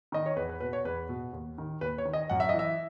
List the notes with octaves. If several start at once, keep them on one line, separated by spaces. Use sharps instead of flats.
D#3 D#5
C#5
E2 B4
B4
B2 B4
C#5
E2 B4
B2
D#2
D#3
D#2 B4
C#5
D#3
D#5
F#2 F#5
E5
E3 D#5
E5